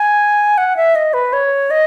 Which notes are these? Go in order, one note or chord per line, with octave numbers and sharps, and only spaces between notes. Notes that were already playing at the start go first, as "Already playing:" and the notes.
Already playing: G#5
F#5
E5
D#5
B4
C#5
D#5